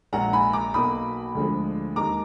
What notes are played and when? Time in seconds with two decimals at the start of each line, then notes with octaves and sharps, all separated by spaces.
0.13 A#1 A#2 G#3 F#5 A#5
0.33 G#5 B5
0.53 A#5 D6
0.74 B1 B2 A#3 B5 D#6
1.35 D2 D3 F3 G#3
1.96 D#2 D#3 G#3 A#5 D6